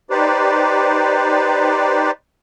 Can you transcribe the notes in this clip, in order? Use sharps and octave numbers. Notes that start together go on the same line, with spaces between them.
D#4 G4 B4 C5 D5